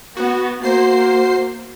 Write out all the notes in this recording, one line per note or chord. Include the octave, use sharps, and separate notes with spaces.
B3 F#4
A#3 F#4 C5 C7